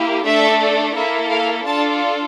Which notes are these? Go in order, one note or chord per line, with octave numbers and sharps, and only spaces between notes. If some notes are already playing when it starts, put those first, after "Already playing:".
Already playing: A#3 E4 G4
A3 D4 A4 E5
A#3 E4 A4 E5
F5
D4 F4 A4 A5